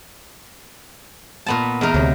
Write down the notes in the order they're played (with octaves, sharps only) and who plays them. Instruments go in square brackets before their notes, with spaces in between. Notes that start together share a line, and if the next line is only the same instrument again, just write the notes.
[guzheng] A#2 B3 A5
E2 D#4 A#4
[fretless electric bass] D2 C3 [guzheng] F#3